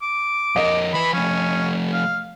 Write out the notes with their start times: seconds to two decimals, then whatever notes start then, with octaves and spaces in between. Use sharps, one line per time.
0.02 D6
0.56 F2 A#4 D#5
0.93 E3 B4 B5
1.13 F3 A3 C#4
1.93 F5